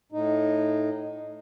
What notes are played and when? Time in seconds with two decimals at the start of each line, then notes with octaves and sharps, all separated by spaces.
0.12 A2 D#4